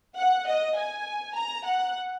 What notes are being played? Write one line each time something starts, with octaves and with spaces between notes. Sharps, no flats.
F#5
D#5
G#5
A#5
F#5